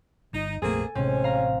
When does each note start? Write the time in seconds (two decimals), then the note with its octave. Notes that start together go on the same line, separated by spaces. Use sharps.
0.33 G1 D#4
0.62 F1 A#1 A3 A#3 C4 G#4 A4 G#5
0.95 A1 C3 G#3 C4 C#4
1.24 F5 A#5